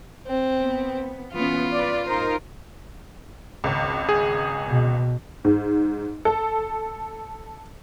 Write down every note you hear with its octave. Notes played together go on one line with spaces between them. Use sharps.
C4
B3
E3 B3 C#4 F4
B4 D5
D#4 A#4 C5
G#1 C#2
G#4
B2
G#2
A4